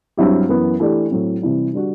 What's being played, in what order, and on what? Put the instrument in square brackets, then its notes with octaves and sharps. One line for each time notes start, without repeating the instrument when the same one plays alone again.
[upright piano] G2 F#3 C4 E4 G4
F#2 E3 B3
E3 A3 D4 G4
A2 F#3 C4
C3 E3 G3
D3 G3 D4 F#4